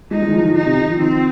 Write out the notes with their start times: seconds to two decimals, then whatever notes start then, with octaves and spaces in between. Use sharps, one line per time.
0.11 G#3 D#4
0.22 G#3
0.28 D#3
0.32 F3
0.44 D#3
0.55 D#3 D#4
0.66 C3
0.78 D#3
0.88 F3
1.00 D#3 C4